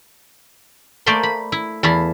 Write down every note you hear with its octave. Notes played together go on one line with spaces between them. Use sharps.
A3 A#3 C5 D5 B5 C6
B5
E4
E2 E4 A4 F5 B5